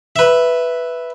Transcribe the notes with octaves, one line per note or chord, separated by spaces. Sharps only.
B4 E5